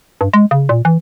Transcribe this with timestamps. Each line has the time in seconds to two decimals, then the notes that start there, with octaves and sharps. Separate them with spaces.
0.21 G2
0.33 G#3
0.51 C#3
0.69 A#2
0.85 E3